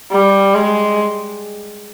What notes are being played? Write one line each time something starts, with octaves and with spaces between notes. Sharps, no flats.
G3
G#3